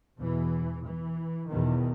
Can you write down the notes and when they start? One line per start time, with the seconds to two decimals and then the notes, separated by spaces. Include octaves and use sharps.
0.19 E2 B2 E3
0.85 E3
1.51 E2 B2 D#3